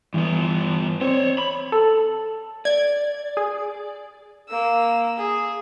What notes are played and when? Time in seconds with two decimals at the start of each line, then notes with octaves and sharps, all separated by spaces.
0.14 G2 E3 B3
1.01 C4 C5 C#5
1.38 B5
1.72 A4
2.65 D5 G#6
3.37 G#4
4.48 A#3 E6
5.18 G#4